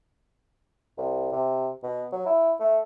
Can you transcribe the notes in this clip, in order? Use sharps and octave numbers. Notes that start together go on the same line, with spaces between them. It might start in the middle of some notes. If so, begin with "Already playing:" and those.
C2
C3
B2
F#3
E4
A3